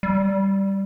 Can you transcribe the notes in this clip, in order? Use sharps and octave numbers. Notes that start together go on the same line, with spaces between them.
G3